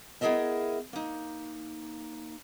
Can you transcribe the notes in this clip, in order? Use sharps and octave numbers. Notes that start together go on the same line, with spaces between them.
B3 E4 G#4 A#4 D#5 E5
A#3 D#4